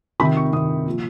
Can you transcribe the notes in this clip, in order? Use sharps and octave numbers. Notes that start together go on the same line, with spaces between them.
C3 D#3 B5
C#6
C3 D#3 D#6
A#2 F3